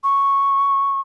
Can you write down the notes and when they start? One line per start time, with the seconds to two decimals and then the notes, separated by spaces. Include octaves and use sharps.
0.03 C#6